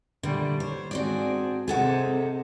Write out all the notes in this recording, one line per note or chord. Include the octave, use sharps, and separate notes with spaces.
A#2 D3 G3 A3
C5 C#5
G#2 C4 D4 F#4 G#4 D5
C3 D#4 G#4 A4 C5 F#5